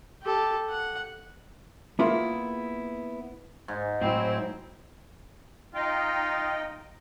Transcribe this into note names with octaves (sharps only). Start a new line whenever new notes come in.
G4 A4
F#5
A#3 B3 E4 F4 G#4 A#4
G#2
A2 F#3 C4 E4
D#4 F4 D#5 G5